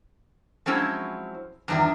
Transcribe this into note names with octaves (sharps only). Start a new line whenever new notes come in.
F3 F#3 G#3 C4 C#4 E4
E2 G2 D#3 F3 D4 E5